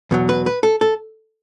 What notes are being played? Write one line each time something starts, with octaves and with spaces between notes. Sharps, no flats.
E2 B2 F#3
B4
B4
A4
A4